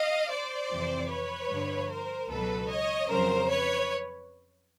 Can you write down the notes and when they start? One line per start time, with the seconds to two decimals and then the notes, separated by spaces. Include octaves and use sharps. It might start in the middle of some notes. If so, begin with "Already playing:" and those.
Already playing: D#5 F5
0.30 C5 D5
0.71 F2 C3 E3
1.10 B4 C#5
1.50 G2 D3 F3
1.90 A#4 C5
2.30 C#2 B2 F#3 A4 B4
2.69 C#5 D#5
3.09 F2 C#3 F#3 A#4 C5
3.49 B4 C#5